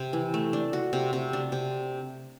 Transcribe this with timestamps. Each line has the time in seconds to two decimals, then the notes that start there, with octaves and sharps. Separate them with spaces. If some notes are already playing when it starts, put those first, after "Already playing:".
Already playing: C3 C4
0.13 E3
0.34 A3
0.53 D4
0.73 F#4
0.93 C3
1.13 C3
1.33 D4
1.52 C3